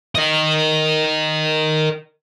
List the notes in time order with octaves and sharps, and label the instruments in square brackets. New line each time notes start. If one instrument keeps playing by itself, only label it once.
[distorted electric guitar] A#4 D#5